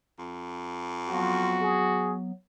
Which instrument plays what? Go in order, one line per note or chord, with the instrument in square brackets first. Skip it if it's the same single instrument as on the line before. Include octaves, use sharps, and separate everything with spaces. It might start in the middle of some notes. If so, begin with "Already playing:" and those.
[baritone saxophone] F2
[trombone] F3 [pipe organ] F#3 B3 [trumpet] F#4
[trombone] G#4